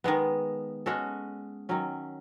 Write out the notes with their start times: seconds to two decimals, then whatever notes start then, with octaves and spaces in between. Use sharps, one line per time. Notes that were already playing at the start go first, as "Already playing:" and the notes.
0.04 D#3 G#3 B3
0.86 G#3 C#4 F#4 A4
1.69 D#3 F#3 C#4